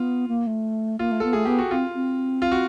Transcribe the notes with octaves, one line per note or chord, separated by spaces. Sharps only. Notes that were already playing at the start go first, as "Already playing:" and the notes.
Already playing: B3 F4
A#3
A3
A#3 F4
A3
B3 A4
A3 G#4
B3 G4
F#4
C4 F4
C4
F4
F#4